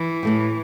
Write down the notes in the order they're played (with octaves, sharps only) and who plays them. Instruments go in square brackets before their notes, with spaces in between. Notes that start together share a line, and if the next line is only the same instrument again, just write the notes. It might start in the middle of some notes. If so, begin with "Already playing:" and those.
Already playing: [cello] E3
[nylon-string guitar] A2 A3 G4